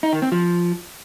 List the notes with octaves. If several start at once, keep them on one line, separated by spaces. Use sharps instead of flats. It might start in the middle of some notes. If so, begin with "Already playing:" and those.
D#4
D#3
C4
F3